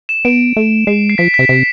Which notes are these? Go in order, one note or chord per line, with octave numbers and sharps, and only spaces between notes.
E7
B3 D7
A3
G#3 C7
C7
F3 B6
B6
C3
C3